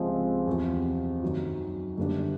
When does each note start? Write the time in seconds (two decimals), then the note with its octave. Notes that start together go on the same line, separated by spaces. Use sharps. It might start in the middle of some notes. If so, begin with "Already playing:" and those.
Already playing: C#2 C3 F3 G#3 C4
0.47 E2 C3 F3
1.22 F#2 D#3 F#3
1.98 F#2 D3 G3 B3 D4